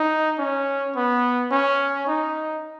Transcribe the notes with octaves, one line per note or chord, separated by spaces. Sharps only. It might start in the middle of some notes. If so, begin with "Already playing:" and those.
Already playing: D#4
C#4
B3
C#4
D#4